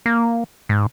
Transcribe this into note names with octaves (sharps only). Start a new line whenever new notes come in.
A#3
G#2